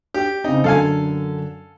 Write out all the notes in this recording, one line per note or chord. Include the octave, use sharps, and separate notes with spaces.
G4
C#3 C4 D#4
F#2 D3 A4 F5 G#5